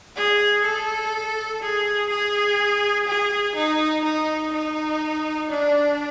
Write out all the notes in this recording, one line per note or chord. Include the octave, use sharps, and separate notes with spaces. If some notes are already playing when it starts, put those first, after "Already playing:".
G#4
A4
G#4
G#4
G#4
D#4
D#4
D#4
D4